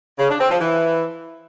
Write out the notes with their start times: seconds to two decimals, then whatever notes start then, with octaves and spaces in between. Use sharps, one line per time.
0.19 C#3
0.29 D4
0.40 C4
0.50 F3
0.61 E3